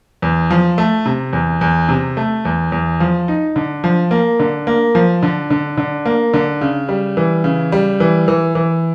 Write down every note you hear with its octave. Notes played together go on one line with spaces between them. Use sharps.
E2
F3
A3
C3
E2
E2
C3
A3
E2
E2
F3
D#4
D3
F3
A#3
D3
A#3
F3
D3
D3
D3
A#3
D3
C#3
G3
E3
C#3
G3
E3
E3
E3